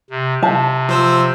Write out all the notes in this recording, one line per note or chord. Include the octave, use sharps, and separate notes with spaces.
C3
C3 A5
F3 C5 E6